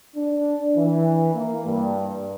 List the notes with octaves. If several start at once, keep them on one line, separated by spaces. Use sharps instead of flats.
D4
E3
A#3
G2